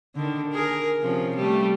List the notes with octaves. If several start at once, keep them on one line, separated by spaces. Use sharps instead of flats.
D3 D#3
G#4 A#4
C3 F3 C#4
G3 A3